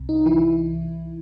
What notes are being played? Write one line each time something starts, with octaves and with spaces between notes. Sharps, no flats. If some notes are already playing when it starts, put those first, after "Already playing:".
Already playing: C2 C3
D#4
E3 E4